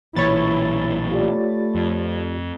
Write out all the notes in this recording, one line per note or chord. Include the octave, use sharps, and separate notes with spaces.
B1 A#2 E3 E4 C#5 B5 A6
A3 F4 G4 D5
F2